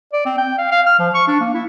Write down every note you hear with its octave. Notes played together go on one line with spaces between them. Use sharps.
D5
C4
G5
F5
F5
F6
F3
C#6
D4
A#3
E4